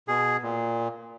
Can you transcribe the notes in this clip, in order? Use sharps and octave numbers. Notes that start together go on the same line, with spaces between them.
B2 G#4
A#2